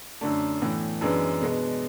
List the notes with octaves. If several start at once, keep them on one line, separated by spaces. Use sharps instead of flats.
F#2 D3 A3 D4
A2 E3 B3
F#2 E3 G#3 B3 D4
B2 G#3 B3